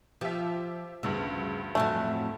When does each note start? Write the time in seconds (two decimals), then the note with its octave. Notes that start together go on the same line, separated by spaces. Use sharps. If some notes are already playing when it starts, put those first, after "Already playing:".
0.21 F3 G4 E5
1.03 D2 G2 C#3 E6
1.75 F2 A2 F#3 A3